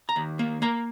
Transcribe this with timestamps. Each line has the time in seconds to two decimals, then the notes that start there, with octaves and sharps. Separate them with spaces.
0.09 A#5
0.16 D#2
0.39 A#3
0.62 A#3 A#5